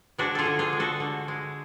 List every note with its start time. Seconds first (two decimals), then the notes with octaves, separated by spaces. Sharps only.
0.18 G#3 D4 F#4
0.35 F4 G#4 A4
0.45 D3
0.59 F4 G#4
0.73 G#3
0.80 F#4 A4
1.00 D3
1.28 G#3